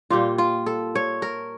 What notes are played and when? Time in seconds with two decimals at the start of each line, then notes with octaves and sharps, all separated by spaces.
0.10 A#2 G3 A#3 F4
0.38 F4
0.66 A4
0.95 C#5
1.22 A#4